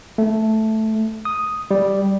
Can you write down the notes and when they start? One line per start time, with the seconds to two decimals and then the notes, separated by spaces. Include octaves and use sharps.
0.18 A3
1.25 D#6
1.71 G3